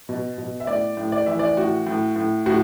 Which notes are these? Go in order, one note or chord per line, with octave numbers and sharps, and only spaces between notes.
B2
B2
E5
A2 D5
A2
D5
E3 E5
D5
A2 F#4
A2
A2
A2 F#4